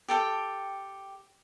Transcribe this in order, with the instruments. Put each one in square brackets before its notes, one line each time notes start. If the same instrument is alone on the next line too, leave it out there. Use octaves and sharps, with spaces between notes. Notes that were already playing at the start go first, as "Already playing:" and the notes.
[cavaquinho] G4 A4 G5